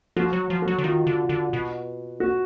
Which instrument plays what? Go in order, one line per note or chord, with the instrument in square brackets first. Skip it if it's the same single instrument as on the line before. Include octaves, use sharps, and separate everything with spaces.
[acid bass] F3 [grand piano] F#4
[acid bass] F#3
F3
[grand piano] F#4
[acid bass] F#3
D3
[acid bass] D#3 [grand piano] F4
[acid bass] D3
D3
B2
[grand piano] F#4